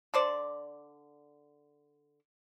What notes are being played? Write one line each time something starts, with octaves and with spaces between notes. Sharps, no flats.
D3 C5 D5